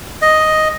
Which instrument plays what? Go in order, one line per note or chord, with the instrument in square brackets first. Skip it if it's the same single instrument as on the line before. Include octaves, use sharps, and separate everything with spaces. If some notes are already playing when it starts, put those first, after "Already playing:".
[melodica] D#5